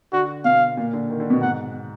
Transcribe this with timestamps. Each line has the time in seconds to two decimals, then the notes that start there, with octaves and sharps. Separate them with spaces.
0.13 D3 F#4
0.45 B2 F5
0.77 A#2
0.93 D3
1.10 D#3
1.20 D3
1.30 B2
1.41 G#2 F#5